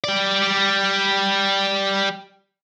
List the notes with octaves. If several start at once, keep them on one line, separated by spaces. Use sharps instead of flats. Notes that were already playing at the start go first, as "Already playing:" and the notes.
G3 D5